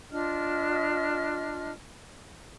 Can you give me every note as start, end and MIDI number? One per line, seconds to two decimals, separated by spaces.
0.12 1.72 62
0.12 1.72 65
0.12 1.72 75
0.12 1.72 89